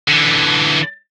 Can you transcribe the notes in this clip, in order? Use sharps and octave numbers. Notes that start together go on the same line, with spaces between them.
D3 E3